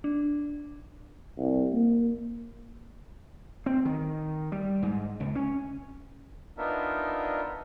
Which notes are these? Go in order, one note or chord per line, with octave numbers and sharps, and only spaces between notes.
D4
C2
A#3
C4
D#3
G3
G#2
C#2
C#4
B3 D4 D#4 F4 A#4 E5